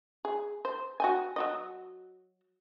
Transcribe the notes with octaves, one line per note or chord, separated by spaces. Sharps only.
G#4
C5
F#4 G5 G#5
F#3 F#4 D#5